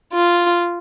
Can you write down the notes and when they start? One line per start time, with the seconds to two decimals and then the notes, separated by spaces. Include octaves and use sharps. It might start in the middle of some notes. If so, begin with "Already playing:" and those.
0.13 F4